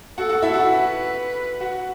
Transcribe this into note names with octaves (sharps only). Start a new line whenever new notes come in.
F#4 A4 F#5
F#4 F#5
E4 E5
F#4 F#5
B4
F#4 F#5